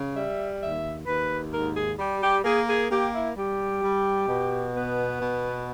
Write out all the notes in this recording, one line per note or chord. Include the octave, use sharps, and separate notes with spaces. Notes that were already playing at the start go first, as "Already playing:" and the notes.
Already playing: C#3
G3 E5
D#2 E5
D#2 B4
G#2 A#4
G#4
G3 G4
G4
A#3 G#4
G#4
A#3 G4
E4
G3 G4
G3
B2
B3
B2